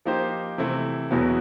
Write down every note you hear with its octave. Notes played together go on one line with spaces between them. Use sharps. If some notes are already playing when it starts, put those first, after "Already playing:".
F3 A#3 D#4 G4 C5
C3 E3 A3 C4 E4
E2 B2 F#3 B3 E4